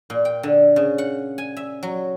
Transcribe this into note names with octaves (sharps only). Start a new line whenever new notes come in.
A#2
G5
D3
C#3
F#5
G#5
E5
F#3